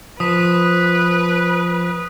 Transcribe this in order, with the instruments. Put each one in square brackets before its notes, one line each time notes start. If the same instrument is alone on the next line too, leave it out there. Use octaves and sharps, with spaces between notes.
[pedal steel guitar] F3 [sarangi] B4 [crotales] D#6 B6